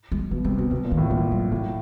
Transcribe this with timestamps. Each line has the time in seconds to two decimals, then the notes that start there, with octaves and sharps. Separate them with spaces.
0.12 G#3
0.31 B2 G#3
0.44 C3 G#3
0.57 B2 D#3
0.71 B2 D3
0.85 A#2
0.91 D#3
0.97 A2
1.10 A#2 E3
1.32 F#3
1.52 A2 F#3